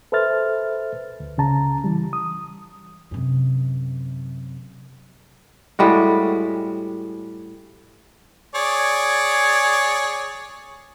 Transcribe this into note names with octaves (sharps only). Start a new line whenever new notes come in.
A4 B4 C5 E5 F6 A6
D2
C#2 C#3 A5 A#5
E3 G3
D#6
F#2 C3
A2 G3 G#3 F#4
G#4 C#5 D5